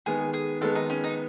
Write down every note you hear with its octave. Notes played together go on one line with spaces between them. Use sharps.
D#3 G#3 B3 G#4
G#4
D#3 G#3 B3 A4
D#4
C#4
D#4